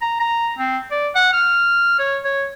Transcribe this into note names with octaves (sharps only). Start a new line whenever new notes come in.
A#5
A#5
C4
D5
F#5
F6
C#5
C#5